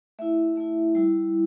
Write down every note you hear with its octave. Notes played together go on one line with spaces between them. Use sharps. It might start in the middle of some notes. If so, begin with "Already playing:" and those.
A3 E4 E5
A3 E4 E5
G3 E4